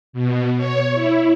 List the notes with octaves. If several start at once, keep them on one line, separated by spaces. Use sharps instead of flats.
B2
C#5
E4